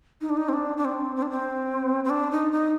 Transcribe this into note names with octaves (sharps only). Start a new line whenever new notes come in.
D#4
D4
D#4
C4
D4
D4
C4
C4
D4
C4
C4
D4
D#4
D#4